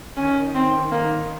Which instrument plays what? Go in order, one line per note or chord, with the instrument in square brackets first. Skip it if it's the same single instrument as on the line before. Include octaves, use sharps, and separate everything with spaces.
[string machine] D#3 [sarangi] C#4
[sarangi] C4
[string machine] D#3 [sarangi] A#3